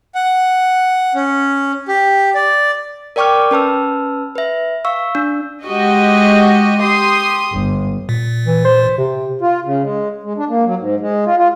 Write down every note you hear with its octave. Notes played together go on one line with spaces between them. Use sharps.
F#5
C#4
G4
D5
A#4 D5 G5 C#6 D6 F6
C#4 B4 A5 E6
B4 E5
F5 C#6 E6
D4
G#3 F#4 G4 D#5
G4 C6 D#6
G1
A#2
E3
C5
C3
F4
C#3
G#3
G#3
D4
A#3
F#3
G#2
G#3
F4
F4